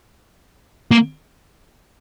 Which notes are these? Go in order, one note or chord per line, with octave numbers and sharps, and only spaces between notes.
A#3